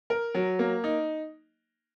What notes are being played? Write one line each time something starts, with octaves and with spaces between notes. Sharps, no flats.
A#4
F#3
A#3
D#4